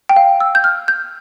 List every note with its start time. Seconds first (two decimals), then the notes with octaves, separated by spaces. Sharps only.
0.09 G5
0.16 F5
0.40 E6
0.55 G6
0.64 F6
0.88 G6